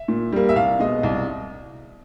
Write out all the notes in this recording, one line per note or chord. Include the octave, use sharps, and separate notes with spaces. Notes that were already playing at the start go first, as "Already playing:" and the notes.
Already playing: E5
A#2
G3 A#3
E5
C2 F5
B2 G#3 D#5
C2